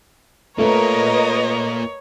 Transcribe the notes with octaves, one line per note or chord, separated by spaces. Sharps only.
A3 A#3 F4 A#4 B4 C#5 D#5